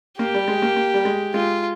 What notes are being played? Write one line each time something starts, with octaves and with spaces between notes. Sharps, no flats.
A#3 G4
G3
G#3
A#3
A#3
G3
G#3
G#3 F4